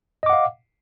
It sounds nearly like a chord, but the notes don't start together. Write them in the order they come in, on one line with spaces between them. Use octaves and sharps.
D#5 D6 F#5 F5